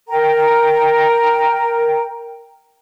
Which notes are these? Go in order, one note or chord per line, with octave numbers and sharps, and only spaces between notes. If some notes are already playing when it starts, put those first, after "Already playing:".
A#4 G5 A#5